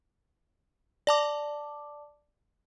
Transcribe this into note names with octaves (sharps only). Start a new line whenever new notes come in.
D5 A5 D6